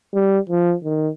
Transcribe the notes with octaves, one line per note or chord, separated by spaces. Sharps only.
G3
F3
D#3